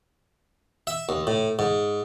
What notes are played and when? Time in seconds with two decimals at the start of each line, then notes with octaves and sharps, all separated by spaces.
0.87 E5
1.09 D#2
1.27 A2
1.59 G#2